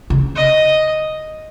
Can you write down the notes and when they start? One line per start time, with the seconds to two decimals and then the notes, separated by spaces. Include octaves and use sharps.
0.10 C#3
0.35 D#5